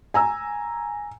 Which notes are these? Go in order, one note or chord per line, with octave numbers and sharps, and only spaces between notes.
G#5 A#5 E6